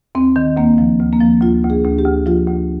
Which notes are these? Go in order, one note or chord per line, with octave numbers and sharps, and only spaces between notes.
D#2 C4
D#3
D2 A#3
F3
D2
A#3
F3
D2 F4
D2
G#4
D2
G4
D2
F3 F4
D2